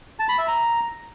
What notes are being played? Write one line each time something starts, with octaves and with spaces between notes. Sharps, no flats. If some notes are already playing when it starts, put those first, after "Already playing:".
A5
B5
E5
A#5